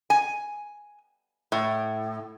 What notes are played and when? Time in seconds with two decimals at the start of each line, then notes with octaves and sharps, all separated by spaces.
0.10 G#5
1.52 A2